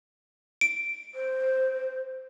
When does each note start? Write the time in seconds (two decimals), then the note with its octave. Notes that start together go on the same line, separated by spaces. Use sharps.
0.61 D7
1.15 C5